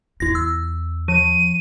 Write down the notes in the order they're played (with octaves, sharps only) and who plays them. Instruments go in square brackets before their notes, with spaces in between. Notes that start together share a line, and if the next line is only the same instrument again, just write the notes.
[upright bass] E2 F4 [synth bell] E4 A#6
[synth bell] E6
[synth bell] F3 [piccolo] D#7